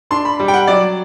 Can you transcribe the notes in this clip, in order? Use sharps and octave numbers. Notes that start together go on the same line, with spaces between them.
D4 C6
B5
G3
G5
F#5
F#3 D5